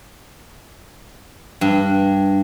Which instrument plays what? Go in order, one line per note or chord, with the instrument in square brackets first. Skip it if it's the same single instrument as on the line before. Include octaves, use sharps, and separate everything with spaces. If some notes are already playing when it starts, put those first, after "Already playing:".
[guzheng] G2